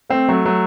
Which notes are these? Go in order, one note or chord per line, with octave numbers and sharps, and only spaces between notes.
A3 C4
F#3 A3
F#3 A3